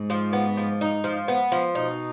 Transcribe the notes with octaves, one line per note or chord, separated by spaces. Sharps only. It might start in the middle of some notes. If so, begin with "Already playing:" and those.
Already playing: G#2
F3
B3
F3
D#4
F3
B3
F3
B2 D#4